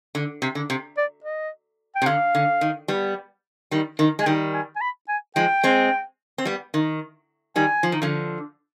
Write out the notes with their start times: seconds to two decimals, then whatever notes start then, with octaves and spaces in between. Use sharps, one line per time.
0.15 D3
0.42 C3
0.55 D3
0.70 C3
0.97 D5
1.24 D#5
1.95 G5
2.02 C3
2.06 D3 F5
2.35 D3
2.61 D#3
2.88 G3 B3
3.71 D#3 G3
3.99 D#3
4.19 G#3 G#5
4.26 D#3 G3 G5
4.54 G#5
4.76 G#5
4.81 B5
5.09 G#5
5.36 F3 G#3 G5
5.63 G#3 C4
6.38 C4
6.45 G3 B3
6.74 D#3
7.56 D#3 G3 G#5
7.83 F3
7.92 D#3
8.02 D3 F3